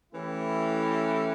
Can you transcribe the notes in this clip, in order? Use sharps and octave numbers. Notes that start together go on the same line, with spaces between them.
E3 A3 C#4 E4 G4